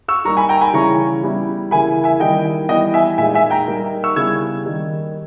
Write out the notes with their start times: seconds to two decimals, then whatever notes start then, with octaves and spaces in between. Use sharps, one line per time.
0.08 C#6 E6
0.25 G3 A#3 D#4 A#5 C#6
0.37 G#5 B5
0.49 G5 A#5
0.61 G#5 B5
0.74 C#3 E3 G3 C#4 E4 A#5 C#6
1.24 G3 B3 E4
1.71 C#3 E3 A#3 E4 G#5 B5
2.04 E5 G#5
2.20 D#3 G3 A#3 E4 D#5 G5
2.69 E3 G3 B3 D#5 G5
2.94 E5 G#5
3.18 A#2 G#3 D#4 E5 G#5
3.34 E5 G#5
3.51 G5 A#5
3.68 G3 A#3 D#4
4.04 C#6 E6
4.16 C#3 G3 B3 E4 E6 G#6
4.65 D#3 G3 A#3 D#4